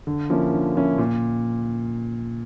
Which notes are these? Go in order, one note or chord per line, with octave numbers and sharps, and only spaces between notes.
D3
F3 A#3 C#4 E4
D3
F3 A#3 C#4 E4
A#2